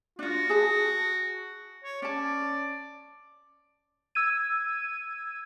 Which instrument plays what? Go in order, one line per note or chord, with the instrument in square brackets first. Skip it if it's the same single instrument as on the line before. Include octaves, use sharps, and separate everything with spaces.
[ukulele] D4 F4 [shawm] F#4
[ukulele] G#4 A5
[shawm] C#5
[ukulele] C#4 A5 [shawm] D5
[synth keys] E6 G#6 D#7